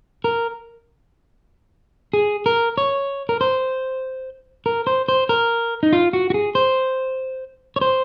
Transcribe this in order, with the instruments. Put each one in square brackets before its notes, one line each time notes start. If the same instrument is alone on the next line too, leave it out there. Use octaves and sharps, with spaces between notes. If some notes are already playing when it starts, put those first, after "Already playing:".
[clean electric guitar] A#4
G#4
A#4
C#5
A#4
C5
A#4
C5
C5
A#4
D#4
F4
F#4
F#4
G#4
C5
C#5
C5